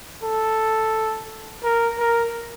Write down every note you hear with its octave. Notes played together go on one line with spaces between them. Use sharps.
A4
A#4
A#4